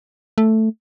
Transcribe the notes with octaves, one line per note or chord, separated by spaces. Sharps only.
A3